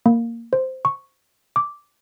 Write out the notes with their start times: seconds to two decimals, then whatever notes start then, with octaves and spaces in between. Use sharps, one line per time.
0.06 A#3
0.53 C5
0.85 C#6
1.56 D6